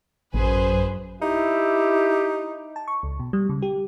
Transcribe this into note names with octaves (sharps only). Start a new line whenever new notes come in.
A1 F#2 G#4 B4 C5
D#4 E4 G4
A5
C#6
C#2
B2
G3
C#3
G4